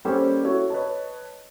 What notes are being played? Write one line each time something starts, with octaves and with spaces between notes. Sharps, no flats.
G3 A#3 C#4 G4 A4 C5
E4 F#4 A4 C#5
B4 C#5 D#5 A5